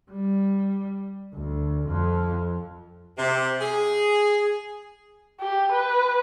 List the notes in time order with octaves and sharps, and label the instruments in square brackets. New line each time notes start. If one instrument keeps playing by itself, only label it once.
[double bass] G3
D2
F2 F3
[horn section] C3
G#4
[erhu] G4
B4